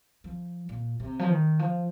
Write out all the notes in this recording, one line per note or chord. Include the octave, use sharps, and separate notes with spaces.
F3
A#2
C3
F3
D#3
F3